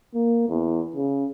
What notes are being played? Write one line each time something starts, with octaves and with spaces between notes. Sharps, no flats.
A#3
E2
C#3